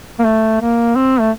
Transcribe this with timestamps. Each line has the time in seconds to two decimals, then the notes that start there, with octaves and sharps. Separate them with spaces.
0.19 A#3
0.25 A3
0.61 A#3
0.95 C4
1.20 A3